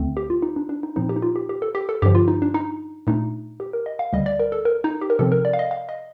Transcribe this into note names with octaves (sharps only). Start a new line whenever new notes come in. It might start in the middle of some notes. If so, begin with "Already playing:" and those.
Already playing: D2 D3 A3 C4
G4
F4
D#4
D4
D4
D#4
A#2 F3 C4 D#4
G4
D#4
F4
G4
G4
A4
G4
A4
G2 D3 F3 G4
F4
D#4
D4
D#4
A#2 A3 D4 D#4
G4
A#4
D#5
F5
D2 D3 G3 D#5
D5
A#4
A4
A#4
D#4
G4
A#4
C3 F3 C4 A4
A#4
D5
F5
D#5
F5
D#5